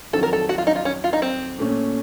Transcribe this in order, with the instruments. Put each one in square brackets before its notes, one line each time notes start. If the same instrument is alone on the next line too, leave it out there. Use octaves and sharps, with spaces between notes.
[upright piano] F2 D#3 F#3 [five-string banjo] A4
[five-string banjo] A#4
A4
F#4
F4
D#4
F4
C#4
F4
D#4
C4
[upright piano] A#2 A3 C#4